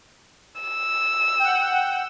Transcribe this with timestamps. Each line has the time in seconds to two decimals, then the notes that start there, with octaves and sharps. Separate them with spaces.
0.61 E6
1.39 F#5 G5